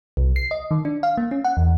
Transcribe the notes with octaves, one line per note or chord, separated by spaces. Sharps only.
C2
C7
D#5
D#3
D4
F5
A#3
C#4
F#5
E2